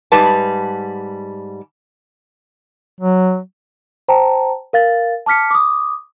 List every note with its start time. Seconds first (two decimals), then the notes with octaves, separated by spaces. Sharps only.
0.12 G#2 G3 B4 A5
3.00 F#3
4.08 C5 G5 A5 A#5
4.73 A#4 F5 A6
5.26 A5 D6 F6 B6 C#7
5.51 D6 D#6